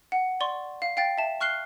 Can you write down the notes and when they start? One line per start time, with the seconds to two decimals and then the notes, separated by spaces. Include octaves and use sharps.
0.12 F#5
0.40 D5 C6 C#6
0.82 F5
0.97 F5 G5 A6
1.18 E5 A5
1.41 C#6 F6 F#6 C7 G7